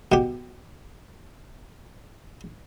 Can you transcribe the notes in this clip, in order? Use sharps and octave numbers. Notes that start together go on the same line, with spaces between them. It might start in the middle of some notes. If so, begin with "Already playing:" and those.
B2 G4